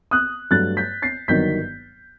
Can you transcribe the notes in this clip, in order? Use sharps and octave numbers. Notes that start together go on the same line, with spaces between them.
D#6 F#6
G2 F#3 A3 F#6 A6
G6 B6
A6 C7
G1 G2 D#3 F#3 G6 B6